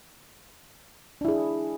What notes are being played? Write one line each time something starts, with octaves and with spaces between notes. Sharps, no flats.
D4 E4 G#4